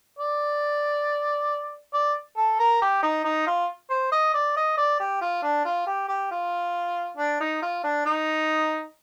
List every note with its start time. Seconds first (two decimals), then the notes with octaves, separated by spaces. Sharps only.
0.19 D5
1.94 D5
2.37 A4
2.59 A#4
2.82 G4
3.03 D#4
3.24 D#4
3.47 F4
3.90 C5
4.12 D#5
4.34 D5
4.56 D#5
4.78 D5
5.00 G4
5.21 F4
5.43 D4
5.65 F4
5.87 G4
6.08 G4
6.31 F4
7.17 D4
7.40 D#4
7.62 F4
7.84 D4
8.05 D#4